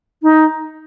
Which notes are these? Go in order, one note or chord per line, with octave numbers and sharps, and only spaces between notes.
D#4